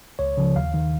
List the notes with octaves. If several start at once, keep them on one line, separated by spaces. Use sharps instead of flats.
C#2 C#5
C#3 F3
D#2 F5
D#3